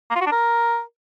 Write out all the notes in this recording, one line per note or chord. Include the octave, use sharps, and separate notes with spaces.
A#3
F4
F#4
D4
A#4